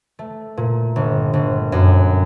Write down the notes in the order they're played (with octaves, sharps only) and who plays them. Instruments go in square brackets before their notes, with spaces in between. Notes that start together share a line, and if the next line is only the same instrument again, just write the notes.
[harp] A3
A#2
G1
G1
F#2